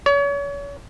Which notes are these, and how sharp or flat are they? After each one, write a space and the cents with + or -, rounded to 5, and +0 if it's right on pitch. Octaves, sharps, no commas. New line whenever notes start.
C#5 +35